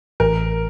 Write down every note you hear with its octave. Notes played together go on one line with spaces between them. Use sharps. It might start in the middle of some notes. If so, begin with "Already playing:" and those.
A1 A#4